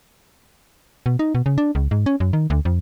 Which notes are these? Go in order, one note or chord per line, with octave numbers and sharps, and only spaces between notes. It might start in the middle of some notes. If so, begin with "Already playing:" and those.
B2
D#4
B2
C#3
D4
C#2
G#2
C#4
F#2
D#3
D2
F2